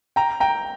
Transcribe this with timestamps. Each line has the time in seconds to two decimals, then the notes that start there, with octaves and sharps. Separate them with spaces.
0.16 G5 A#5
0.40 G5 A#5